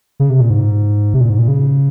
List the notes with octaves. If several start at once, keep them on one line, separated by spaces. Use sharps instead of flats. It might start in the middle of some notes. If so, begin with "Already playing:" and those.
C#3
C3
A#2
G#2
C3
A#2
G#2
A#2
C#3